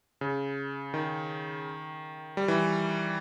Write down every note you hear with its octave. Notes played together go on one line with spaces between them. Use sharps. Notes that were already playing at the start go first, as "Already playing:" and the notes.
C#3
D#3
G3
E3